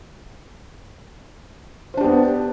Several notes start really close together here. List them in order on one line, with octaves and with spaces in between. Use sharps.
C5 D4 G4 B3